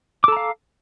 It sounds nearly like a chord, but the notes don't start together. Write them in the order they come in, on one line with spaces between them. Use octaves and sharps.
D6 A4 A#5 F5